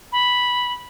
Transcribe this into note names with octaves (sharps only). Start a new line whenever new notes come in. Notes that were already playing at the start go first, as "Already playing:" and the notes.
B5